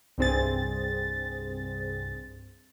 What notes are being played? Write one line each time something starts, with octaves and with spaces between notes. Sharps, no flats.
C2 G2 C4 G#4 A6